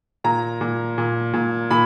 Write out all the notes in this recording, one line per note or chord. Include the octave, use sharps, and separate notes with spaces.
A#2 A#5
A#2
A#2
A#2
A#2 B5